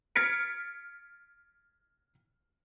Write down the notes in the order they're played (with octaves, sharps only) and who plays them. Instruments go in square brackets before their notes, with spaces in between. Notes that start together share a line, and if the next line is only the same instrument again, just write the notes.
[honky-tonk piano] F6 G#6 A6 B6 C#7 D7